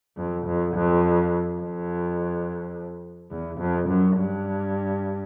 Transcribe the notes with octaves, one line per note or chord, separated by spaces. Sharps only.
F2
F2
F2
F2
E2
F2
F#2
G2